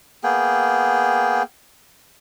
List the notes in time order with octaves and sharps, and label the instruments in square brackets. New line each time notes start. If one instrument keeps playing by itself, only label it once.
[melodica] A#3 B3 G#4 G5